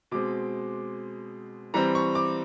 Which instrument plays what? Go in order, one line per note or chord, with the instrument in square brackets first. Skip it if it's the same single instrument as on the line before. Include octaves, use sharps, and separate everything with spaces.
[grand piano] B2 G#3 C4 D6
E3 G3 C4 A#5
C#6
D6